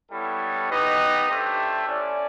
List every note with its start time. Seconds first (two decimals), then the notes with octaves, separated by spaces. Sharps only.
0.12 G3 B3 E4 A4 C#5
0.70 B3 D#4 G4 B4 D#5
1.29 A3 D4 G4 C5 E5
1.87 C#4 E4 A4 D5